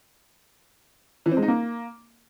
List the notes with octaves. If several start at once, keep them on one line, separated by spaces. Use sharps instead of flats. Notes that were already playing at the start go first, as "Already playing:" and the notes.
E3
C4
G#3
D#4
A#3